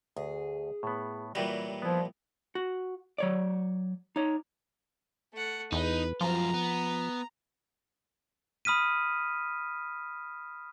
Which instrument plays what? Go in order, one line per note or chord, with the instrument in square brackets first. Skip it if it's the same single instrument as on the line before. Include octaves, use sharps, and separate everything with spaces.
[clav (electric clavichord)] D2 [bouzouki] G#4
[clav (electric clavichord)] A2 B3
[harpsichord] A#2 E3 G3 [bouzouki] F#3 [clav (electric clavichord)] F#4 G4 G5
[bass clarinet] F3 [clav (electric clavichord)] B3 E4
[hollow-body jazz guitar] F#4
F#3 C#5 D5
D#4 C#5
[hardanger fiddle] A3 F#5
[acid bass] E2 [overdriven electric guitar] D#4 [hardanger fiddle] B4
[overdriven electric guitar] F#2 F4 [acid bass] F3 [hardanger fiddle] A#5
[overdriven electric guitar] B3
[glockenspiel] B5 D#6 F6 B6 D#7